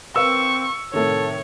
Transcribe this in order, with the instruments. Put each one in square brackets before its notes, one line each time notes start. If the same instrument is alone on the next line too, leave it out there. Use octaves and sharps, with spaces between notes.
[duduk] C4 [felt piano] A#4 B4 F5 [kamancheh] C#6 [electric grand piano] E6
[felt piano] A2 C3 D#3 [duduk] A4 [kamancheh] C#5